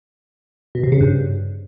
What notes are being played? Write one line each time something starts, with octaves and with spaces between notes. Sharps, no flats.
B2
C3
C#3
G2